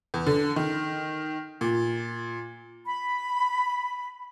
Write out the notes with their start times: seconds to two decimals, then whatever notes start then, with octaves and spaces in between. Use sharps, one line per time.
0.14 E2
0.27 D3
0.56 D#3
1.61 A#2
2.85 B5